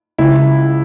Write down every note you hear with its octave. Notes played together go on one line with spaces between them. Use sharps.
C#2 E4